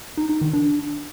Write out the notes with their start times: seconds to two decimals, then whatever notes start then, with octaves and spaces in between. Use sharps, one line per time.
0.17 D#4
0.29 D#4
0.41 D#3
0.53 D4